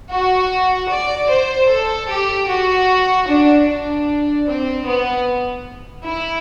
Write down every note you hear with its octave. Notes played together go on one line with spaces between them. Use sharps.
F#4
D5
C5
A4
G4
F#4
D4
D4
C4
B3
E4